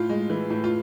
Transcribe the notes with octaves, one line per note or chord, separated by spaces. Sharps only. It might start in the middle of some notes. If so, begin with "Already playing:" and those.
Already playing: A2 F4
G#3
E3
A2
F4